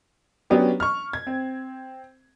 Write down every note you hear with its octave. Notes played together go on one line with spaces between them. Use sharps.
F#3 B3 C#4 D4 G4
C#6 F6
G#6
C4